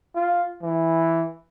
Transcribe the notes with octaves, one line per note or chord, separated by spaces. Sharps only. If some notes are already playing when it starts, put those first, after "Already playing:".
F4
E3